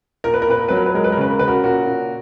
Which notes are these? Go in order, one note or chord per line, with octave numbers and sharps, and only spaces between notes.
A#2 A#4
B4
A#4
A#2 B4
A#4
F#3 B4
A#4
B4
G#3 A#4
B4
A#4
C#3 B4
A#4
C#3 B4
F#4 A#4
A#2 F#4 A#4
A#2